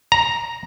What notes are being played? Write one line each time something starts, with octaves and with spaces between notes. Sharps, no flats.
A#5